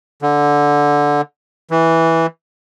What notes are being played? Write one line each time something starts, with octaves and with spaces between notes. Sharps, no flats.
D3
E3